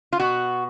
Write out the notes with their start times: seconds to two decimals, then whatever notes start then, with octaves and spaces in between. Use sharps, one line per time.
0.13 F4
0.20 B2 F#4